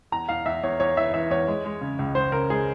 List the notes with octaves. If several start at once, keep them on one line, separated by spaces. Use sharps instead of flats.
E2 A#5
E2 F5
E2 E5
E2 C#5
E2 C#5
E3 E5
E3 E5
E2 C#5
G#3
G#3
C#3
C#2
C#2 C5
C#3 A#4
G#3 G#4